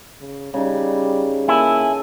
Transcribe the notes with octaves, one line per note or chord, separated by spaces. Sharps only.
C#3
C#3 G3 D#4
A#3 E4 A4 G#5